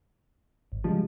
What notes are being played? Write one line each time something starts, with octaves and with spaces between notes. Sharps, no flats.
G#1
C#3 F3 G3 G#3